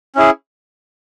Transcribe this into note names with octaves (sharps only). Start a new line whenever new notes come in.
C#4 E4 G#4